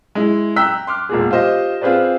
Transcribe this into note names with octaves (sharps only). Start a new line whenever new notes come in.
G#3 E4
G5 A#5 E6 F#6 B6
C6 D6 F6
E1 A#2 G#4
F4 G4 C5 D#5
C4 F4 G#4 B4 C5 D5